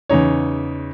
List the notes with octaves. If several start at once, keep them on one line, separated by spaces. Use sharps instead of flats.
E2 C#3 D#4 C#5